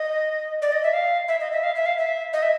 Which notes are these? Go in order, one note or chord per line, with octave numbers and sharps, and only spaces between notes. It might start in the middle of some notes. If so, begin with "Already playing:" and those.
Already playing: D#5
D5
D#5
E5
F5
E5
D#5
E5
F5
E5
F5
E5
D#5
E5